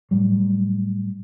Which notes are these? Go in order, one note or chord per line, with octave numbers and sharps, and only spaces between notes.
A2 F#3 G3